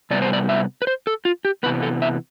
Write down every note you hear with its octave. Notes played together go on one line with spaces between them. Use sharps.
C3 G3 B3 D5
C5
D5
E5
B4
C5
A4
F4
G4
C3 E3 B3 B4
A4
E5